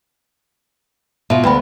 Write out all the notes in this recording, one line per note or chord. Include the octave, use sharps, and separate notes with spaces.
B2 F4 E5
D2 B3 B4 G5 B5